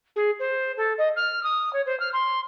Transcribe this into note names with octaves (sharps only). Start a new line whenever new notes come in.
G#4
C5
A4
D#5
F6
D#6
C#5
C5
F6
C6